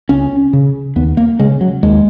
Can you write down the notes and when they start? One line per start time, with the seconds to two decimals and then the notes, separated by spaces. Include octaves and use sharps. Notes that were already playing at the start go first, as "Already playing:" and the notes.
0.09 C#2 C#4
0.53 C#3
0.96 D#2 B3
1.17 A#3
1.39 C#3 G#3
1.61 F#3
1.83 D#2 G#3